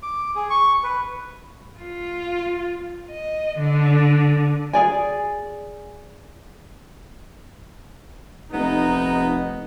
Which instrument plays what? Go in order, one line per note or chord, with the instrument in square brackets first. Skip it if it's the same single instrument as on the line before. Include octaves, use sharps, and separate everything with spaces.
[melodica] D6
G#4
C#6
B4
[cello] F4
D#5
D3
[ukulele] G#4 D5 G#5
[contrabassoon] F1 [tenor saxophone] B3 [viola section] D#4